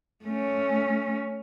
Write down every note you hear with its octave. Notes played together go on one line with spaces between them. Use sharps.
A3 C#4